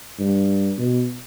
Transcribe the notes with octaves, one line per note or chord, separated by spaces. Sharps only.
G2
B2